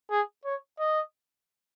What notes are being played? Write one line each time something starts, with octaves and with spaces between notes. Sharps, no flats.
G#4
C#5
D#5